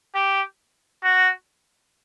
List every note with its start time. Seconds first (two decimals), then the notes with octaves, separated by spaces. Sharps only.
0.15 G4
1.03 F#4